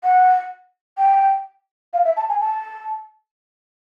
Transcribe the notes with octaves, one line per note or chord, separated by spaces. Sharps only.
F#5
G5
F5
E5
A5
G#5
A5